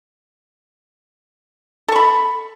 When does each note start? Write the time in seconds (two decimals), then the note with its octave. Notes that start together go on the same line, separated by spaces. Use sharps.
1.88 A4
1.92 C#6
1.96 B5